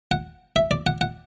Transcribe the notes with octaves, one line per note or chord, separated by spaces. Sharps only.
F#5
E5
D5
F#5
F#5